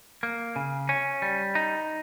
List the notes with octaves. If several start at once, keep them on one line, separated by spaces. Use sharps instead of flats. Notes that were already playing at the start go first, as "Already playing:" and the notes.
A#3
C#3
C#4
G3
D#4